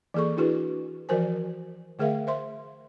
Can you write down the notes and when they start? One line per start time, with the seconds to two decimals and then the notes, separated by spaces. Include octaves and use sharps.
0.14 E3 A#3 G#4 A4 C#6
0.37 D4 E4 F#4 G#4 B4
1.09 E3 F3 F#4 A#4 C5 G#5
1.99 D3 A3 G#4 A#4 E5 F5
2.27 C5 E5 C6